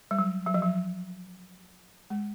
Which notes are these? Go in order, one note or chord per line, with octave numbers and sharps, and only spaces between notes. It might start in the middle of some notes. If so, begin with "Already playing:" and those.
G3
F#3
F#3
F3
F#3
G#3